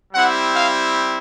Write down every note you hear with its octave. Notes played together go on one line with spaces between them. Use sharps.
G3 C4 E4 G4 F#5
F5